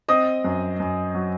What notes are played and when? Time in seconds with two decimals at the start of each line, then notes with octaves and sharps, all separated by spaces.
0.09 C4 D#5 D#6
0.44 F#2
0.80 F#2
1.15 F#3